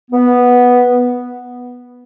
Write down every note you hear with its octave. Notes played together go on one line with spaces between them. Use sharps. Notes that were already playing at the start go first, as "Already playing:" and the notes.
B3